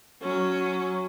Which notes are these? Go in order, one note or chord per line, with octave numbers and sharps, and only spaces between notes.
F#3 C#4